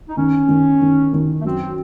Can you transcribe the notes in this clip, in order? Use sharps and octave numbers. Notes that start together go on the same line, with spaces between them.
D#4
D#3 C#4
D#3
D#3
D#3
A3
F#2 C4